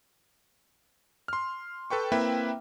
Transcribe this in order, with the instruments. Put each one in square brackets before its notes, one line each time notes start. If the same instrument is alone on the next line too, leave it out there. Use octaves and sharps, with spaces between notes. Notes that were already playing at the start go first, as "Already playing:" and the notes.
[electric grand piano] C6 F6
A4 B4 G5 C#6
A#3 C4 E4 B4 E5 G5